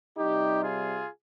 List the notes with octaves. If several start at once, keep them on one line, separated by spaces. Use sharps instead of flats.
C3 G3 D#4 G4
F4 G#4